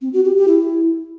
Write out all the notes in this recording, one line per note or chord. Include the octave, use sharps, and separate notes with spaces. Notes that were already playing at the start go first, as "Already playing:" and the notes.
C4
F#4
G4
G4
E4